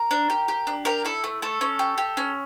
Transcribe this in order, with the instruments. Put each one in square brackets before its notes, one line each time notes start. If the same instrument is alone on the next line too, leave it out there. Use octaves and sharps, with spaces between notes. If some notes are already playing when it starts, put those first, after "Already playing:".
Already playing: [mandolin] A#4
D4
G4
G4
D4
G4 A#4
E4 A4
A3
A3 A4
C#4
G4
G4
C#4